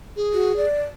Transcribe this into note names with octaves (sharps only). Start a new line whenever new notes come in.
G#4
F#4
D5